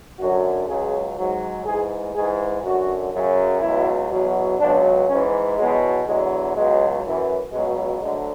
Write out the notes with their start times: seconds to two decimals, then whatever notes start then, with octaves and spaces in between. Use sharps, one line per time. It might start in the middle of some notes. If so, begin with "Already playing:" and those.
0.18 F#2 D3 F#3 F#4
0.67 C#2 C#3 F#3 G#4
1.16 G#2 F#3
1.66 G#2 E3 G#4
2.14 G#2 E3 G#4
2.63 F#2 D3 F#3 F#4
3.12 F#2 C#3 F#3
3.61 C#2 B2 F#3 E4
4.10 E2 B2 F#3
4.59 C#2 B2 F#3 D4
5.08 G#2 E3 C#4
5.57 E2 B2 F#3 G#3
6.05 E2 D3 F#3 G#3
6.55 C#2 B2 F#3 G#3
7.03 F#2 E3
7.52 C#2 B2 F#3 G#3
8.01 D2 D3 F#3 G#3